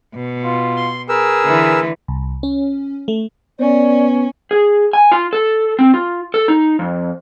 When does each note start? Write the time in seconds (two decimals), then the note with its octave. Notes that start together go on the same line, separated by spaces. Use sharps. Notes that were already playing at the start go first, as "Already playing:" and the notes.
0.14 B2
0.44 F4
0.76 C6
1.09 G#4 A#4 B4 E6
1.44 D3 E3
2.08 C2
2.43 C#4
3.08 A3
3.60 B3 C#4 D5
4.51 G#4
4.93 G#5
5.12 F4
5.33 A4
5.79 C4
5.94 F4
6.34 A4
6.48 D#4
6.79 F2